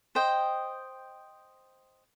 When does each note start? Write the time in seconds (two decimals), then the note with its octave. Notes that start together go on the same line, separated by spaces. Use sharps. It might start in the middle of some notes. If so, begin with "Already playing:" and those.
0.15 C5 D#5 G5